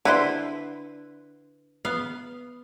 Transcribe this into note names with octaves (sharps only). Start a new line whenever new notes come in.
D3 E4 B4 C5
B3 F5